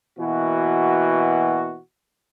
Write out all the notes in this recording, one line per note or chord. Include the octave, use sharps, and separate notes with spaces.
B2 E3 A#3 F#4